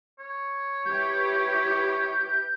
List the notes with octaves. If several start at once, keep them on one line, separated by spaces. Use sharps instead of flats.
C#5
E4 G4 B4 G6